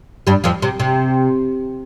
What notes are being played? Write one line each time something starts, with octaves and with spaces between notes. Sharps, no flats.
G2 G3
F2 F3
C3
C3